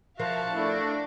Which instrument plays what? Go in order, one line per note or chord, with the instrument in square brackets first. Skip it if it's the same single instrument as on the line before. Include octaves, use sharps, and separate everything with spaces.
[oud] F3 A#4 C5 [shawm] F#4 [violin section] E5 F5 A5
[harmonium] A3 E4 [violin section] D4